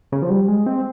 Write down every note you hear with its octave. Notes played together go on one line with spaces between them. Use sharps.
C#3
F3
G3
G#3
C4